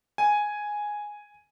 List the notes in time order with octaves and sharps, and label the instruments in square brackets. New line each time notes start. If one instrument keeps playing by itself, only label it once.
[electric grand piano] G#5